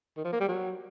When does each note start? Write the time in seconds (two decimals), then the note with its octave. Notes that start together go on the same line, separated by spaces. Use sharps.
0.17 D#3
0.25 F3
0.33 A#3
0.40 G3
0.48 F#3